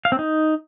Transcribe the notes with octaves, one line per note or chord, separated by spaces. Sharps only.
F5
C4
D#4